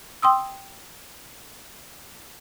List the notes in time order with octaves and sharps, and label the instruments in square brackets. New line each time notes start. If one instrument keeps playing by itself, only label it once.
[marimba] G5 C6 D#6 E6